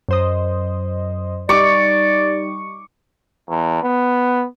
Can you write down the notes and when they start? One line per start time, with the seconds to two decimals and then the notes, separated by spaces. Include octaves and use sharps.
0.09 F#2 C5 D#5
1.49 G3 D#4 D5 C#6 D6
3.49 E2
3.83 B3